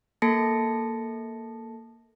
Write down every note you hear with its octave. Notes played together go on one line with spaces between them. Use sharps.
A#3 A4 A5 A#6 C#7